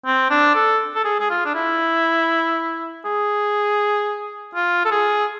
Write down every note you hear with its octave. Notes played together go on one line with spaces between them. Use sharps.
C4
D4
A4
A4
G#4
G#4
F4
D4
E4
G#4
F4
A4
G#4